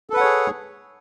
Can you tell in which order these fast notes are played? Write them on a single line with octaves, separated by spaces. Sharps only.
A4 B4 F#5 C#5 G#4